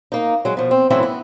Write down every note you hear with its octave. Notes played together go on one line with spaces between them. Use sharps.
A#3 D#4
F#3 G#3
B2 F3
C4
A2 E3 F#3 C4 C#4 E4
B3